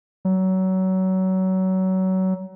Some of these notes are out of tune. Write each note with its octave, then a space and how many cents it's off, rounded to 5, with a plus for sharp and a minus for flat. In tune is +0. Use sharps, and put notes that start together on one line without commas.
F#3 +25